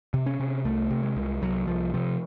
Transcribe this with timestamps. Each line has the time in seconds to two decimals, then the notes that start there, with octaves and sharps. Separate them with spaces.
0.14 C3
0.26 C#4
0.40 C3
0.65 C2 A3
0.90 C3
1.03 G#3
1.16 C2
1.42 C2 F#3
1.67 C2 F3
1.94 C3 F3